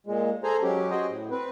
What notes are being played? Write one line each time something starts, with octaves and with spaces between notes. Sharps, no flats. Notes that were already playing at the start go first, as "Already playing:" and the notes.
A#2 G#3
G#4 A4 C5 G#5 A#5
F#3 G#3 C#4 G4
F#4 G#4 C5 D#5 G5
A2
C4 B4